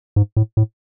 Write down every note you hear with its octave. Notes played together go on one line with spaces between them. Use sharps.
G#2
A2
A2